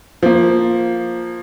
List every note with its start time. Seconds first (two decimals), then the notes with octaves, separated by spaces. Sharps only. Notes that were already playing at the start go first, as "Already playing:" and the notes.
0.23 F3 A#3